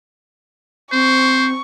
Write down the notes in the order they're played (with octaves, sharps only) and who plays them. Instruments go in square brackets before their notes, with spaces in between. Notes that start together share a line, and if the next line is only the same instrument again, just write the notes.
[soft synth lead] C4 [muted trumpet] C5 [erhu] C#6